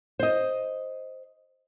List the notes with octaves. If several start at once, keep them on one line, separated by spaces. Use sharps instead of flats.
C5 D#5